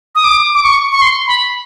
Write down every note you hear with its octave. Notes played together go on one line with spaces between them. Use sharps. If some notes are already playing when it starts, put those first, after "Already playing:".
D#6
D6
D6
C#6
C#6
C6
B5